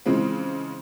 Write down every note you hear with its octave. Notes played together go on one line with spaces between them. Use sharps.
C#3 E3 F3 G#3 C4